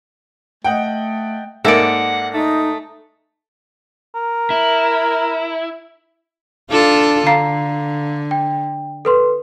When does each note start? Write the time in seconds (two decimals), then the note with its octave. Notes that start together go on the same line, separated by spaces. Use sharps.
0.64 A3 D#5 F#5 G5
1.65 G#2 A#3 A4 D5 E5 F#5
2.34 A3 D#4
4.15 A#4
4.50 E4
6.70 D4 F4 A4
7.27 D3 F5 A#5 C7
8.31 G5
9.05 A4 B4 C6